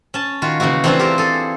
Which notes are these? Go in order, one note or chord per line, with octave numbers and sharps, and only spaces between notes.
C#4 A5
D#3 F4 F#4
C#3 E3 A#3 E4 F#4
E3 A3 C4 D4 F4 F#4
G4 A#4 C5
G#4 A4